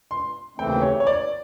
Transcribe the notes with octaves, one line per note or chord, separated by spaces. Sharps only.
C6
D#2 C#3 E3 A3 C4 G5
C#5
C#5
D5